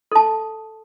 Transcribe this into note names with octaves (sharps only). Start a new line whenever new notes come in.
A4 A5